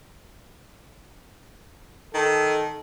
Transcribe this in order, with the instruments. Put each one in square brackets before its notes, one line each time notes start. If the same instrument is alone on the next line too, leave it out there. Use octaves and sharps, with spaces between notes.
[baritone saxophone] D#3 [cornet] A4